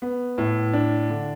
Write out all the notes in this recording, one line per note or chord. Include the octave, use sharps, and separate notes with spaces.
B3
A2
D4
D3